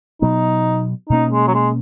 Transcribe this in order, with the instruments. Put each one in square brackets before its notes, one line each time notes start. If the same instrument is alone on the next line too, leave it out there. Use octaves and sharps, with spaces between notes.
[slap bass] B2 F#3 B3 [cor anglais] D#4
[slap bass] B2 A#3 C#4 [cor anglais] D#4
[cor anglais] G#3
F#3
G#3